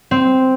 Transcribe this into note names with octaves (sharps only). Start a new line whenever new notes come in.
C4